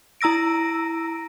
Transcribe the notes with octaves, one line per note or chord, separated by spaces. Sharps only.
E4 A#5 E6 A#6 D7